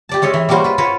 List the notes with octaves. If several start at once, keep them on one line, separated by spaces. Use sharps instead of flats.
G4 D5 A5
G#3 C#4 C#5 D#5 E5
E3
G3 A#3 C#4 F#4 C5
F4 B4
F4 F#4 B4 C#5